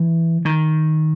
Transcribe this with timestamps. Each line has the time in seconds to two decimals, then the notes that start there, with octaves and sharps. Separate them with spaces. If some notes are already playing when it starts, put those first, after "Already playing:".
Already playing: E3
0.45 D#3